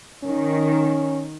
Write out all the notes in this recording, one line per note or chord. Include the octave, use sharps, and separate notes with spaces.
D#3 C#4